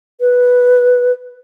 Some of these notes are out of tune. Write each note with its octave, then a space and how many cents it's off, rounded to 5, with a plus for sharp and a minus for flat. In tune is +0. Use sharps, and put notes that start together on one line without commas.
B4 -5